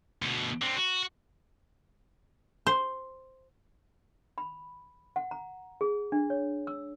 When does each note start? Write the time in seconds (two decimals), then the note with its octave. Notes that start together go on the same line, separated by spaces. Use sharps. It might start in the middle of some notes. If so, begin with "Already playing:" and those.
0.22 D2 B2
0.62 D3 C4
0.77 F#4
2.67 C5
4.38 B5
5.16 F#5
5.31 A#5
5.81 G#4
6.12 D4
6.30 C#5
6.67 E6